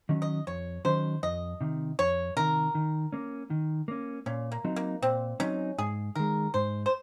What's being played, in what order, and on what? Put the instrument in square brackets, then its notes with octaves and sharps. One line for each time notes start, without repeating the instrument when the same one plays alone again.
[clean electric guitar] D#3 F#3 C#4
[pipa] D#5
[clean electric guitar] F2 [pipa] C#5
[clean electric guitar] D#3 F#3 C#4 [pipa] C5
[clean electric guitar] F2 [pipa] D#5
[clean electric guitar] C3 D#3
[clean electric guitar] F2 [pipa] C#5
[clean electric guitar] C3 D#3 [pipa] A#4
[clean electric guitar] D#3
A#3 C#4
D#3
A#3 C#4
[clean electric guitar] A#2 [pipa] C#4
[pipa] A#3
[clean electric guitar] F#3 C4 D#4
[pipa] A#3
[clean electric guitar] A#2 [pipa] C4
[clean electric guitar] F#3 C4 D#4 [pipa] C#4
[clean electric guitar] G#2 [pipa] G#4
[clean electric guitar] D#3 G#3 [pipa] A#4
[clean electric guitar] G#2 [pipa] C5
[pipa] C5